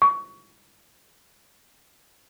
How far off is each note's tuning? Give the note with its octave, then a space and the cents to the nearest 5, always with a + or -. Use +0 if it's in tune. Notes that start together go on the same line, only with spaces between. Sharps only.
C#6 +25